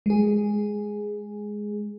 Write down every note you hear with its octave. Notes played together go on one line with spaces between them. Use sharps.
G#3 G#4